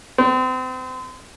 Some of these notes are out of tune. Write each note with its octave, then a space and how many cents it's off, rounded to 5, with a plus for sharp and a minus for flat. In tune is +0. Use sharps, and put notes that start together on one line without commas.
C4 -35